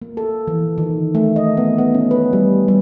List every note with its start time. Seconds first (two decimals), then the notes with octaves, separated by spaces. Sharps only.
0.02 A#3
0.17 A4
0.47 E3
0.78 D#3
1.15 A3
1.36 D#5
1.57 B3
1.78 B3
1.94 C#4
2.11 B4
2.33 G3
2.68 G3